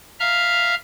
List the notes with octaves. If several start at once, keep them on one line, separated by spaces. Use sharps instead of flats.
E5 F5 A#5 F6